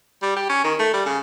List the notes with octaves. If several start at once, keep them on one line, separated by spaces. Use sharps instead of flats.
G3
G4
C#4
D#3
A3
G3
C#3